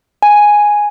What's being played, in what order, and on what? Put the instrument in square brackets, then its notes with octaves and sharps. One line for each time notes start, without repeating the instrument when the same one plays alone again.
[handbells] G#5